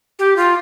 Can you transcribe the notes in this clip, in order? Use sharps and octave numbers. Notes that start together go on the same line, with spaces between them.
G4
F4